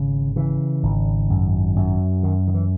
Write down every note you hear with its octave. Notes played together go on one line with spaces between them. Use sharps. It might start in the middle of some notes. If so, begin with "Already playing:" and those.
Already playing: G#1 C#3
C#3 E3
G#1
F#2
F#2
F#2 D#3
D#3
E3